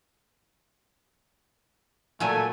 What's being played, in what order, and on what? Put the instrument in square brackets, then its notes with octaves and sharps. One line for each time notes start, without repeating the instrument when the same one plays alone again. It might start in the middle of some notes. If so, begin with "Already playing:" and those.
[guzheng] A#2 F#3 [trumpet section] A3 A4 G#5